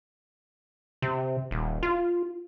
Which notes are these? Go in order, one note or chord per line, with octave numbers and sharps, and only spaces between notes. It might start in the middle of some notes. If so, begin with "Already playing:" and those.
C3
D#1
F4